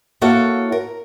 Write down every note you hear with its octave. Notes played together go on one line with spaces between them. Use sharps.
A#3 E4 F#4 A4 C#5 F5
A#4